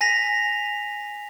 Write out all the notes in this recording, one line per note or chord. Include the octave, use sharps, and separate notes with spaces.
G#5 A#6 B6 F7